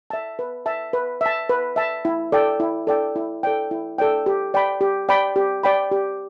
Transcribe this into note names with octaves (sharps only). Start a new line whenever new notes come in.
E5 A5
B4
E5 A5
B4
E5 A5
B4
E5 A5
E4
A4 D5 G5
E4
A4 D5 G5
E4
A4 D5 G5
E4
A4 D5 G5
G4
D5 G5 B5
G4
D5 G5 B5
G4
D5 G5 B5
G4